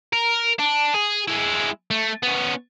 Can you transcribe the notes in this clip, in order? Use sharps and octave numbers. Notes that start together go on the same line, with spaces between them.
A#4
D4
G#4
G#3 E4
A3
B3 C#4